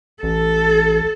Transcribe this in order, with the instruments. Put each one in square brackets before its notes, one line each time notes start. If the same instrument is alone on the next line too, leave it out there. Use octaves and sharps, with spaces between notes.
[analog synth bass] A1 [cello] A4